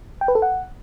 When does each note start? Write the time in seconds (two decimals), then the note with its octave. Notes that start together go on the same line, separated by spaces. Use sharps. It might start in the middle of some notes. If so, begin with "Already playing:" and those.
0.21 G5
0.28 B4
0.35 A4
0.42 F#5